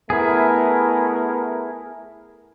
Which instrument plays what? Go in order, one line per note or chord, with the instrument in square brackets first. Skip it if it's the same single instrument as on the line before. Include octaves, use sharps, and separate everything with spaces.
[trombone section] A3 B3 A#4 [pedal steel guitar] E4 G#4